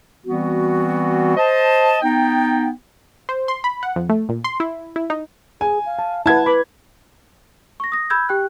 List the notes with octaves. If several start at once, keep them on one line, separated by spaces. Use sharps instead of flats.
E3 G3 B3 C4 F#4
C5 D#5 A5
B3 D#4 G5
C5
C6
B5
F#5
F2
A3
A#2
C6
E4
E4
D#4
G#4 G#5
F5
A5
E4 B4 F#5 A5 G#6
B4 B5 D6
C#6 A#6
D#6 A#6
B5 E6 G6 G#6
G4 G5 F#6